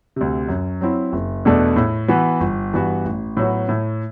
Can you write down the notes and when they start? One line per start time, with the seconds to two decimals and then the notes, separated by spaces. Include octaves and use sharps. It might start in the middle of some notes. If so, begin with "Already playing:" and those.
0.16 D2 C3
0.48 F#2
0.81 F#3 C4 E4
1.13 F#1
1.45 E2 B2 A3 D4
1.76 A2
2.08 E3 B3 F#4
2.40 G1
2.73 G2 E3 B3 F#4
3.05 A1
3.37 A2 F#3 B3 F#4
3.69 A2